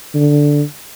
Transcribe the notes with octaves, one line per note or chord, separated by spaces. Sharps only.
D3